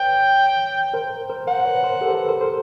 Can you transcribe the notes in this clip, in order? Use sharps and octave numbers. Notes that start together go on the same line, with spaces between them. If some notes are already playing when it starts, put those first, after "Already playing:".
Already playing: B4 C#5 G5
A#4 C5
A#4 C5
A#4 C5 F#5
B4 C#5
A#4 C5
G4 A4
C5
A4 B4
A#4 C5
A#4 C5